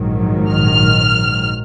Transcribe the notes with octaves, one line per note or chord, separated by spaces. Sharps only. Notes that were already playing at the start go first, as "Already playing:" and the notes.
Already playing: A#1 G#2 D#3 F#3
F6